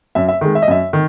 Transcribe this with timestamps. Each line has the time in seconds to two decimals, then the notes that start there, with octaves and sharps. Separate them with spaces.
0.15 F#2 E5
0.29 E5
0.41 D#3 G#3
0.55 E5
0.62 D#5
0.68 F#2 E5
0.93 D#3